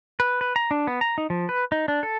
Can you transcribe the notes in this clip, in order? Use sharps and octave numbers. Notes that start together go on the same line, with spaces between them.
B4
B4
A#5
D4
B3
A#5
D#4
F3
B4
D#4
D4
A4